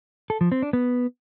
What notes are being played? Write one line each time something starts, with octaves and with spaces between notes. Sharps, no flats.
A4
F3
C4
D4
B3